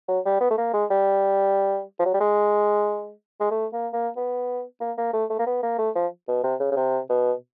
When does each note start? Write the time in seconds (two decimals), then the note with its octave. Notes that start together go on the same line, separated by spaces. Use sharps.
0.08 F#3
0.25 G3
0.41 B3
0.51 A3
0.58 A#3
0.73 G#3
0.90 G3
1.99 F3
2.05 F#3
2.14 G3
2.20 G#3
3.40 G#3
3.51 A3
3.73 A#3
3.94 A#3
4.16 B3
4.80 A#3
4.98 A#3
5.13 A3
5.30 A3
5.39 A#3
5.46 B3
5.63 A#3
5.78 A3
5.95 F3
6.28 B2
6.43 C3
6.60 C#3
6.71 C#3
6.76 C3
7.09 B2